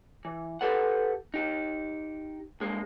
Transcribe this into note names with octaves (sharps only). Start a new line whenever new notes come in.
E3
G4 A4 B4 F#5
D#4 G4
G2 G#3 A#3